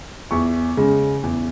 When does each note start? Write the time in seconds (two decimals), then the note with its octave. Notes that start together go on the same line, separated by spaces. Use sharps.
0.31 E2 C#6
0.77 C#3 G#3
1.23 E2